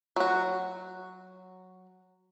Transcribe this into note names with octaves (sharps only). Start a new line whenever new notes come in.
F#3 F#4